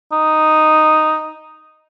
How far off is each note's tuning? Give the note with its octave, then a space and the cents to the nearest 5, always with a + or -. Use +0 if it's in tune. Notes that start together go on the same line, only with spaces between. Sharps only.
D#4 -5